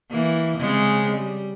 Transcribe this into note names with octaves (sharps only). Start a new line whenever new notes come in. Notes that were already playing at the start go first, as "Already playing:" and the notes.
E3 A#3
C#3 G#3 C4
G3